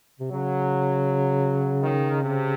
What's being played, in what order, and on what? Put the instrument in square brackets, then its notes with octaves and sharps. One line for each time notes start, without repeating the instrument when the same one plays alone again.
[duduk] C3
[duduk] C#3 [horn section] F#3
[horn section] D#3
C3